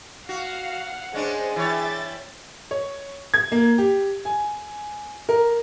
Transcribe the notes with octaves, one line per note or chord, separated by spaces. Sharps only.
F#4 F5 F#5
G#3 C#4 D4 G#4 C5
E3 C#5 E5 G5 A6
C#5
G#6
A#3
G4
G#5
A#4